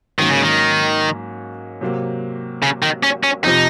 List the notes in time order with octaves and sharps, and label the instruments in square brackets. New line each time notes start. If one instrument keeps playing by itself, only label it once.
[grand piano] G#2 F#3 A#3 C#4 [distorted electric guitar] D#3
[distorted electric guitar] C#3
D#3
[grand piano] C3 F#3 A#3
[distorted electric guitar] C#3
D#3
C#4
C#4
[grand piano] F2 C3 F3 [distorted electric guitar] D#4